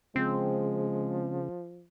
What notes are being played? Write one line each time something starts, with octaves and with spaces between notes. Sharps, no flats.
C#3 F3 G#3 C4